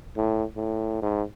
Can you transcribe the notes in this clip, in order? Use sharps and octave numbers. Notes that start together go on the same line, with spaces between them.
A2
A2
G#2